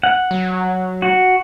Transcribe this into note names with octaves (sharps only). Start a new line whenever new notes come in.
F#5
F#3
F#4